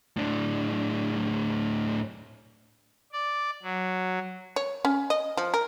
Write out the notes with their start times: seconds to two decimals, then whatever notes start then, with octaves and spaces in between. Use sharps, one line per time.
0.16 A2 D4
3.13 D5
3.63 F#3
4.56 C#5
4.85 C#4
5.10 D#5
5.37 F3
5.54 A#4